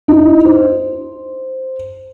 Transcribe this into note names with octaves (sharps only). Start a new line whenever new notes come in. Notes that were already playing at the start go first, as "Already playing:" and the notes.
D#4 E4
C5